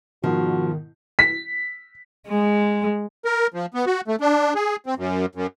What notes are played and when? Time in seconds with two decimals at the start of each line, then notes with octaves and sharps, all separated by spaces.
0.24 G#2 B2 D#3 F3 F#4
1.19 B6
2.28 G#3
3.25 A#4
3.54 F3
3.74 B3
3.86 F#4
4.08 A3
4.21 D4
4.55 G#4
4.86 C4
4.97 F#2
5.35 F#2